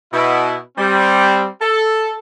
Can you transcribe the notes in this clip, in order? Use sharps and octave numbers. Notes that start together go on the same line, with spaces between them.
B2 E4
G3 C4
A4